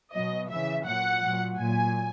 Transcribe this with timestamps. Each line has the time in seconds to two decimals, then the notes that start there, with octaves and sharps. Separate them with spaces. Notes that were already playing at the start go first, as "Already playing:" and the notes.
0.13 B2 F#3 D#5
0.50 C#3 E3 E5
0.86 A#2 F#3 F#5
1.22 F#3
1.27 A#2
1.59 A#2 F#3 G#5